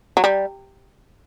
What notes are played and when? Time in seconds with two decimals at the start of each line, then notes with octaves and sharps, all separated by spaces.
0.17 F#3
0.24 G3